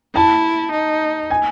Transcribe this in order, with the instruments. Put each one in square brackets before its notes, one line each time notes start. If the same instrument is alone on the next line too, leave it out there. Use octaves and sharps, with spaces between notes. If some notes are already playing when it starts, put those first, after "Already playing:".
[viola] E4 [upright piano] A5
[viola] D#4
[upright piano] G#5